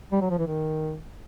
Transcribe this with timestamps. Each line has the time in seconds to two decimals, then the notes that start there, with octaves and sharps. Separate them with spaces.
0.12 G3
0.21 F#3
0.30 F3
0.38 E3
0.47 D#3